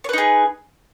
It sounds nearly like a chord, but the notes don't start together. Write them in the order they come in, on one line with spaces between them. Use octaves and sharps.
C#5 B4 D#4 G#4